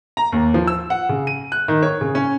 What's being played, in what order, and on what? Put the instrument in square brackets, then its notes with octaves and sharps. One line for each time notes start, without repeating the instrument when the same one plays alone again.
[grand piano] A#5
D#2
F3
E6
F#5
C#3
D#7
F#6
D#3
C#5
C#3
C#4